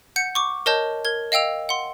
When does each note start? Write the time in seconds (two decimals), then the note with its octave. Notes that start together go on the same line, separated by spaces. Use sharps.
0.16 F#5 G6 C#7
0.35 C#6 D6
0.66 A#4 C#5 D#5 A5 G6
1.05 A#4 G#6
1.32 D#5 F5 G5 E6 F7
1.69 F#5 C6